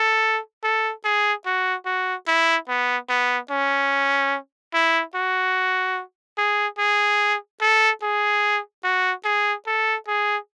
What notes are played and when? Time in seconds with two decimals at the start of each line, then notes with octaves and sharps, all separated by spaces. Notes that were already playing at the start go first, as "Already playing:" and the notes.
Already playing: A4
0.64 A4
1.05 G#4
1.46 F#4
1.86 F#4
2.27 E4
2.68 B3
3.09 B3
3.51 C#4
4.74 E4
5.15 F#4
6.38 G#4
6.78 G#4
7.61 A4
8.02 G#4
8.84 F#4
9.25 G#4
9.67 A4
10.08 G#4